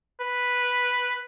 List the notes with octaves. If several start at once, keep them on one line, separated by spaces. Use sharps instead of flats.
B4